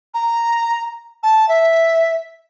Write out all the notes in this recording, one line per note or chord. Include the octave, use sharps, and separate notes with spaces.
A#5
A5
E5